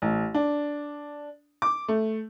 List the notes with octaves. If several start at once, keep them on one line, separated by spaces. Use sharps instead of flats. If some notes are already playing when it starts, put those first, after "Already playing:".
A1
D4
D6
A3